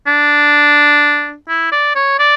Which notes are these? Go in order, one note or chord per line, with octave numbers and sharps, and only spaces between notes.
D4
E4
D5
C#5
D5